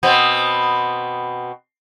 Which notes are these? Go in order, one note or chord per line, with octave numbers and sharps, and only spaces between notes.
B2 B3 C4